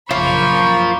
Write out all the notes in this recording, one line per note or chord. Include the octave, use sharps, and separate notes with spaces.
A#1 F#2 C#3 A#3 F4 C5 B5 C#6